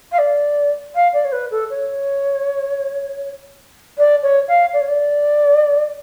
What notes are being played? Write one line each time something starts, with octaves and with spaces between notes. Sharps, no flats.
F5
D5
F5
D5
C#5
B4
A4
C#5
D5
C#5
F5
D5
C#5
D5